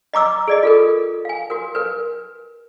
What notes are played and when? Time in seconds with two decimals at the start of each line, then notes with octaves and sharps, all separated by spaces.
0.13 D#5 A#5 D6 E6
0.48 G#4 D5 D#5
0.63 F4 A4 A#4
1.25 F5 G#5
1.50 F#4 A#4
1.75 A#4 B4